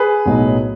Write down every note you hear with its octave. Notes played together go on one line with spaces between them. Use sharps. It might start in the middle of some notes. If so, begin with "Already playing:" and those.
Already playing: G#4 B4
B1 A2 F#3 B3 D#4